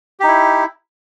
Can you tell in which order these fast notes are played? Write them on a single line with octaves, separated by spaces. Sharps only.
G4 D#4 E4